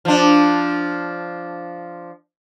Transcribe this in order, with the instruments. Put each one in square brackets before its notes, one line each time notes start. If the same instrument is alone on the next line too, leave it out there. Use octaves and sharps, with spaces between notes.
[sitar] F3 D4